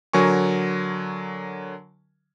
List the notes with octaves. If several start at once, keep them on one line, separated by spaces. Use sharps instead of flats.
D3 F#3 A#4 G#5 C#6